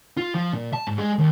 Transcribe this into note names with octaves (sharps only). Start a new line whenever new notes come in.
F4
F3
A#2
A5
G#2
G#3
D#2